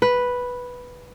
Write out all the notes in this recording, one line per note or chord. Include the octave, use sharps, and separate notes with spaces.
B4